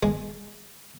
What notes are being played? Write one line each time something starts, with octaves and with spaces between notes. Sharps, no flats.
G#3